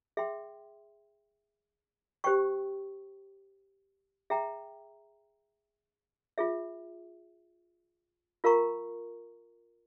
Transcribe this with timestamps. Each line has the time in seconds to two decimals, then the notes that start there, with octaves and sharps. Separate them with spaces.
0.17 G#4 E5 G5 C6
2.24 G4 C5 G5 C#6
4.30 G#4 E5 G5 A#5
6.38 F4 G#4 E5
8.44 F4 A#4 F5 A#5 C#6